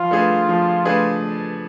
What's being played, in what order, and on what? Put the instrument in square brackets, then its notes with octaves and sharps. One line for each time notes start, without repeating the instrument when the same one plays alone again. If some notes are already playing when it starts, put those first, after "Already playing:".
Already playing: [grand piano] F3 [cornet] F4
[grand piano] A3 D4 G#4 B4
F3
A3 D4 G#4 B4